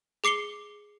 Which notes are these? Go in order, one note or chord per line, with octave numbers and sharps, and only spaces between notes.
G#4 D6 C7 C#7 G7